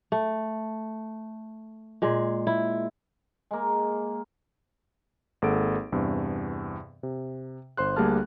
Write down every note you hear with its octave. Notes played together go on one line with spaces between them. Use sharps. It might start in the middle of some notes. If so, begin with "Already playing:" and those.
A3
A#2 G#3
E4
G#3 A#3
G#1 A#3 G#4 A4 F#5 D7
E2 G2 C3
C3
G1 C5 C6 F#6
D2 G3 A#3 G#4 A5 F6